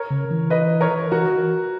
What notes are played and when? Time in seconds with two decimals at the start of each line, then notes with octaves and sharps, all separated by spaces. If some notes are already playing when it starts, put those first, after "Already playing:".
Already playing: A#4 C#5
0.10 C#3
0.31 E3
0.50 B4 D#5
0.81 A#4 C#5
1.12 E3 F#4 A#4